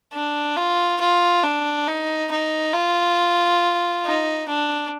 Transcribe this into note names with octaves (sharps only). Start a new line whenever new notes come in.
D4
F4
F4
D4
D#4
D#4
F4
D#4
D4